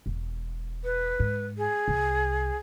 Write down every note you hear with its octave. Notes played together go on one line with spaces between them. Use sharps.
E1
B4
G#2
G#4
C2